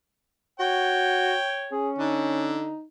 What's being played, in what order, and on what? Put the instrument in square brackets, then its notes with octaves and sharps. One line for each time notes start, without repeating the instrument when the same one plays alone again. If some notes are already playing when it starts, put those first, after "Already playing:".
[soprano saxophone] F#4 [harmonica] C#5 G5
[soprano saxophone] C#4 [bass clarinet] G#4
[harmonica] D3 [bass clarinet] D#4